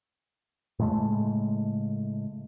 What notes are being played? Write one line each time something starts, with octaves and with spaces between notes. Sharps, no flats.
A2 C#3 G#3 A3